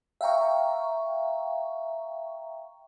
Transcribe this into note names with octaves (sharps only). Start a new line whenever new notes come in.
E5 F5 G5 A#5 C#6